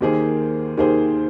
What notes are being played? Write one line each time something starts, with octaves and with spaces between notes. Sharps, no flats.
D#2 D#3 A#3 G#4 C5
D#2 D#3 A#3 G#4 C5